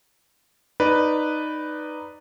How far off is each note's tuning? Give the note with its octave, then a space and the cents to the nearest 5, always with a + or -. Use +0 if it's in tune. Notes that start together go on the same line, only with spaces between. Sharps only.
D#4 -10 B4 +0 D5 -5